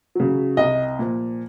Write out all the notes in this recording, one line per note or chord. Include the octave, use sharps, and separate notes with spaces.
C#3 F#3
C2 D#5
A#2 F3